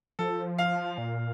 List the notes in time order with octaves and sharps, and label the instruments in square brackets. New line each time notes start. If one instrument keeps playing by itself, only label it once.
[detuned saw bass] F3 [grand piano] A4
[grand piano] F5
[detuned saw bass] A#2